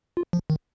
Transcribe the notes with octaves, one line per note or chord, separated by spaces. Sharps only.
F4
F3
D#3